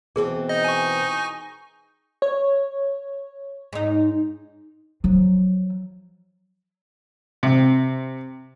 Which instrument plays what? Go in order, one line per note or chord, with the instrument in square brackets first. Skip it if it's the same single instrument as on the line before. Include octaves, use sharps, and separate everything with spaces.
[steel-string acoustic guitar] B2 E3 C4 [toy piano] G#4 A#4
[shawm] D#4 [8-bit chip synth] D#5
[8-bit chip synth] G#5 C#6
[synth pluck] C#5
[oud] G#2 D#4
[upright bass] F3 F#3
[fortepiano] C3